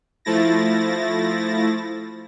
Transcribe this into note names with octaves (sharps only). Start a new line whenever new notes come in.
F3 A3 E4 A6 A#6